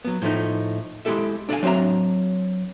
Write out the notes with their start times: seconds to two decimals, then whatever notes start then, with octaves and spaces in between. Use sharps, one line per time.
0.05 F#3 B3
0.22 A2 F3 A3 D#4
1.05 G#3 E4 G4 A4 E5
1.49 D4 A4 D5 E5 F5 G#5
1.63 F#3 C4 D4 E5 A#5